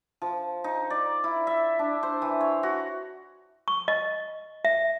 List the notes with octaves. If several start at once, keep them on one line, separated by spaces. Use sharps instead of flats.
F3
D#4
D5
E4
E5
D4
C5
E3
C#5
F#4
C#6
D#5
E5